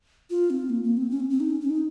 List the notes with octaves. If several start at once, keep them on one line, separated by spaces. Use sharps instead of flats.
F4
C4
A#3
A#3
C4
C#4
C4
C4
D#4
C#4
C#4
D#4